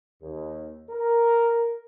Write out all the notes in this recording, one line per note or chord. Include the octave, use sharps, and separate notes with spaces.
D#2
A#4